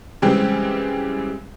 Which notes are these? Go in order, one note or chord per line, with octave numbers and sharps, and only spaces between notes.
C#3 E3 G3 G#3 C4 G4